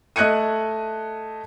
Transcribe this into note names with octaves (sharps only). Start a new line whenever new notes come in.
A3 D#5 F#6 G#6 C#7 D#7